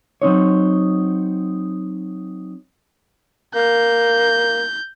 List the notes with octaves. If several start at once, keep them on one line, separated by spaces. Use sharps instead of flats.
F#3 C4 D#4 C#5
A#3 G6